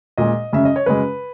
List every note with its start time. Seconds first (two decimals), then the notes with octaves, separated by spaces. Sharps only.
0.17 A#2 G#3 D#5
0.52 F#2 C#3 G#3 E5
0.65 D#5
0.76 C#5
0.86 F#2 C#3 G#3 B4